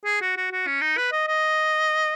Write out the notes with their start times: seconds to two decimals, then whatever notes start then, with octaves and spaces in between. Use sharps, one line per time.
0.05 G#4
0.21 F#4
0.37 F#4
0.52 F#4
0.67 C#4
0.82 D#4
0.98 B4
1.12 D#5
1.28 D#5